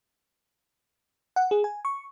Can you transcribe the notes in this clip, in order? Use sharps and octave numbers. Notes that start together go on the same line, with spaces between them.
F#5
G#4
G#5
C#6